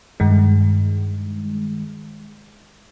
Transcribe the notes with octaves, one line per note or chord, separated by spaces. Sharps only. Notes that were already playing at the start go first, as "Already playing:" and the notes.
G2 D#3 G#3